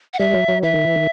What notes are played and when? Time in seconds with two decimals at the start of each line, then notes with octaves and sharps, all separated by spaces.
0.13 F#5
0.19 G3 E5
0.34 F#3
0.48 F#3
0.63 E3 E5
0.74 D#3
0.85 E3
0.96 D#3